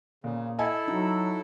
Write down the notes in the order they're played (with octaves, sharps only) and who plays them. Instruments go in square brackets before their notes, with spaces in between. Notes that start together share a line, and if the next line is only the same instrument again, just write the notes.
[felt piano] A#2 [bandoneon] C#3
[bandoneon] E4 A4 [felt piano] D#5 E5 G#5
[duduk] F#3 [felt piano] D#4 F#4